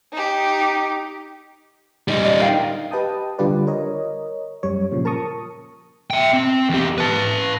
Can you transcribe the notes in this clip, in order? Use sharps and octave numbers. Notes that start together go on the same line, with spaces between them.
D#4 G4
G3 D#4
D5 D#5
A#4 F5 G5
G4 B4 D#5 G5 A5 D#6
D3 G3 F4 G4 B4 D5
A#4 C#5 D#5
F#2 G3 C#5
A#2 C#3 F3
A#4 A5 A#5 C#6 D#6
E5 G5
C4
E2 G4
B4 A5